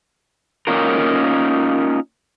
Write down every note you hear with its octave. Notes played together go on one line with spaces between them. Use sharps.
A#3 C#4 D#4 F4 A#4